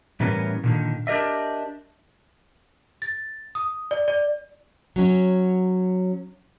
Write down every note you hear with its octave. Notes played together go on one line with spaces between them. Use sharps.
A2 E3 G3 B3 C#4 A#4
A#2 D3 D#3
D4 G4 A#4 D#5 E5
A6
D#6
D5
D5
F#3 C#4